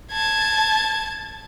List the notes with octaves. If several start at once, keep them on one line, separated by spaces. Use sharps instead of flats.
A5 G#6